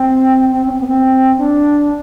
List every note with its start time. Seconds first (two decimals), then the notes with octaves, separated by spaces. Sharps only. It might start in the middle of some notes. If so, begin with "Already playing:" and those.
Already playing: C4
0.52 C4
0.66 C#4
0.73 C4
0.80 B3
0.87 C4
1.38 D4